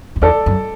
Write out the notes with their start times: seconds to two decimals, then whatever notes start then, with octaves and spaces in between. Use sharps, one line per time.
0.16 F#2
0.22 E2 A4 D5
0.46 F#2